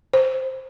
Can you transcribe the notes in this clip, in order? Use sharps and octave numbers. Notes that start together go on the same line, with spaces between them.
C5